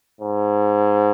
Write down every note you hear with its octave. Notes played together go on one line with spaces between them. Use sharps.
G#2